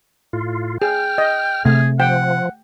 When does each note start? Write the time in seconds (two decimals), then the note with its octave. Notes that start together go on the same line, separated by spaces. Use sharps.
0.33 A2 F4
0.82 G#4 G5 F6
1.18 D#5
1.65 C3 A3 G#4
2.00 F3 F#5 G5